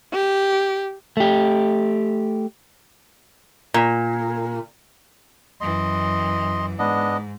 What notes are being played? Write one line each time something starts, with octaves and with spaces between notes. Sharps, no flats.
G4
A3 G4
A#2
F#2 E3 D#5 C6
G#2 B3 D4 D#5